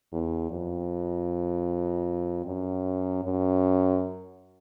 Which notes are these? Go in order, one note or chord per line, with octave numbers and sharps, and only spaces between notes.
E2
F2
F#2
F#2